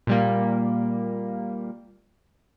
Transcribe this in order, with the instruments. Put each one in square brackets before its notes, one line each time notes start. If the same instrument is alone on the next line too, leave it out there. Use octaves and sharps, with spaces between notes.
[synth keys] A#2 G3 A#3